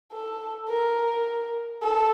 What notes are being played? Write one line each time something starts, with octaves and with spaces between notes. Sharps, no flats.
A4
A#4
A4